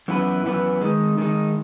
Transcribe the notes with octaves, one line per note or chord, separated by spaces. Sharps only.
F#2 E3 B3 F#4 B4
F#2 E3 B3 F#4 B4
D#3 G#3 D#4
D#3 G#3 D#4